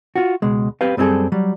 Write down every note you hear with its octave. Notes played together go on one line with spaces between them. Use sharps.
F4 F#4
C#2 B2 G#3
C4 G4 B4 F5
F#2 G3 C4 E4 G#4 A4
F#3 G3